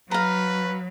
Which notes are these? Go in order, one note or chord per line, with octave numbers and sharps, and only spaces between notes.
F#3 B4 F5 A#5